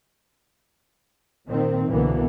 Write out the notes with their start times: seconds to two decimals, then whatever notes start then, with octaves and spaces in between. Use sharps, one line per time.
1.47 A#2 D#3 C4
1.87 C2 B2 D3 E3 A#3 B3